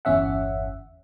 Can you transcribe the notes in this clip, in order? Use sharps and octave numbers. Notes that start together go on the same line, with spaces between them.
G1 E2 C#4 E5 F#5